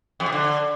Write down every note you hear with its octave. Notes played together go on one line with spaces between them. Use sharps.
F2
C3
D3